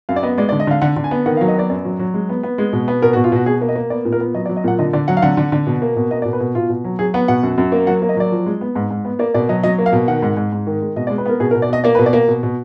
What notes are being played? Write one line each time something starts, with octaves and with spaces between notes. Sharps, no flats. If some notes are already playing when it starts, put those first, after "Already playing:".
F#2 F5
D5
B3 D#5
G#3 D5
D5
D3
D#5
D3 F5
D3 F#5
D3
G#5
B3
D#3 F#5
F5
F#3
D#5
B3 D5
F#2 D5
F#3
F#3
G#3
B3
B3
G#3
B2
B3
B2 A#4
F#4
B2
F4
B2 F#4
B2 G#4
A#3
D#5
A#3
B3 D5
A#2
A#4
B3
F#3 D#5
D5
F#3
D#5
A#2 F#5
D3 D#5
D3 D5
F#3 F#5
F5
D3 F#5
D3
D3
B2
A#3
B2
A#3 D#5
D5
B2
B4
B2
B2 F4
B2
F#3
F#3 G#4
B3 F#5
B2 F#5
F#2
F#2
A#3
F#3 F#5
A#3
D#5
F#3 D5
F3
G#3
B3
G#2
G#2
B3
A#3 D5
B2 D5
F#3 D#5
F#3 D#5
A#3
F5
B2
D#3 F#5
G#2
G#2
G#2
D#3
G#3
B2 D#5
D5
G#3
B4
B3 A#4
B2 G#4
A#4
B2
D5
B2 D#5
A#3 D5
B4
B2
D5
A#3
B2
B2